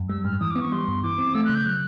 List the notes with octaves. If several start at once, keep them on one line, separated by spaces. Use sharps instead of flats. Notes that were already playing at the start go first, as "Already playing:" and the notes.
Already playing: F#2
G3 E6
G#2 F6
E3 D#6
D6
B3
C#6
G3 C6
G2
E3 D6
C4
A3 E6
F#6
C#3
G6
F#3 F#6